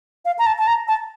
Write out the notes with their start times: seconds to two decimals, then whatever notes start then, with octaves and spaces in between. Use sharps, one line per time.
0.25 F5
0.39 A#5
0.46 A5
0.58 A5
0.67 A#5
0.88 A5